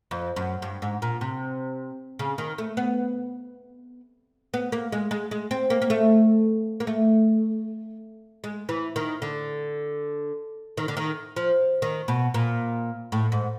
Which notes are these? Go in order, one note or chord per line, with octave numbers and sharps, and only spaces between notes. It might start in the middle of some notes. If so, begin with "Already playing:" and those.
F2
F#2
G2
G#2
A#2
C3
C#3
D#3
A3
B3
B3
A#3
G#3
G#3
G#3
C4
A#3
A#3
A3
A#3
A3
G#3
E3
D#3
D3
D#3
D3
D#3
F3
D#3
B2
A#2
A2
G#2